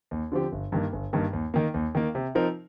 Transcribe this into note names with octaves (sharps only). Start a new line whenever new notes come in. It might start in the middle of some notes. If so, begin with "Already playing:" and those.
D#2
D3 F3 C4 G4
G1
G2 D#3 A#3
G1
G2 D#3 A#3
D#2
D#3 A#3
D#2
D#3 A#3
C3
F3 C4 D#4 A#4